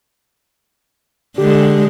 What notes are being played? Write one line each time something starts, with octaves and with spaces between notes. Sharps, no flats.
D3 G#3 G4